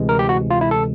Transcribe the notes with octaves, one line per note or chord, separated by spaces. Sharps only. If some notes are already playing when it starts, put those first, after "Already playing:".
Already playing: D2 C3 E3 G#3
A#4
G4
F#4
F4
E4
A4